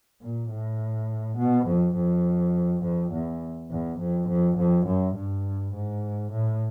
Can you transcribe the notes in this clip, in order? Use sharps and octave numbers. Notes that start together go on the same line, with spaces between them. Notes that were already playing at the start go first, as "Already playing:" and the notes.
A#2
A2
B2
F2
F2
F2
E2
E2
F2
F2
F2
F#2
G2
G#2
A2